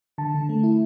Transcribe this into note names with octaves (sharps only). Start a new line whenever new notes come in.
D3 A5
D3
A3
E4